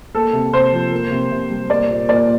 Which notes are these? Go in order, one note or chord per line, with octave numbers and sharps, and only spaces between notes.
A#3 A4
C3
C3 C5
F3
A#3
C3
C3
G3
A#3 D5
A#2
A#2 D5